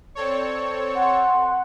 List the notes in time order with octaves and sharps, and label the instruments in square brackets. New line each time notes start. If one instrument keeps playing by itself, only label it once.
[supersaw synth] C4 A4 C#5 [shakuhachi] D5
[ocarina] F#5 [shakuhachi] C6